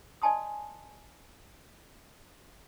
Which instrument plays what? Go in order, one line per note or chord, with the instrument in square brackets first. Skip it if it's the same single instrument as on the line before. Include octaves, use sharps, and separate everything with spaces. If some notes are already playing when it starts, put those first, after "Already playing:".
[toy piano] D5 D#5 G#5 A5 C6 D#6